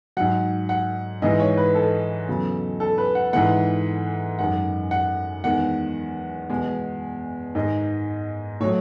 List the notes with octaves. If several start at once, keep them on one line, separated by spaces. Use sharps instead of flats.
G#2 F#3 F#5
F#5
G#2 E3 G#3 D#5
C#5
B4
A4
E2 C#3 F#3
A4
B4
F#5
G#2 E3 G#3 F#5
F#2 D#3 G#3 F#5
F#5
E2 D#3 G#3 F#5
E2 B2 G#3
G#2 D#3 G#3 D#5
A2 F#3 C#5